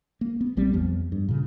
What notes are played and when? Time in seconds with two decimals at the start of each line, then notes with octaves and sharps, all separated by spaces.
0.21 A#3
0.41 B3
0.57 A#1 G3 C4
0.73 F2 F3 B3
1.12 G2
1.29 A#2 C#3